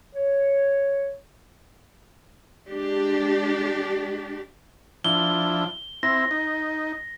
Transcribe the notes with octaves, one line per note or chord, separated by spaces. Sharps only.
C#5
G#3 D4 G4
F3 D4 E4 G7
C4 E4 A#6
D#4